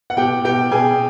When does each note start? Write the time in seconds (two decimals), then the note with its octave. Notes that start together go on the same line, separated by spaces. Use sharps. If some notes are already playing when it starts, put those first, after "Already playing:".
0.10 F#5
0.17 B2 G4 G5
0.45 B2 G4 G5
0.71 B2 G#4 G#5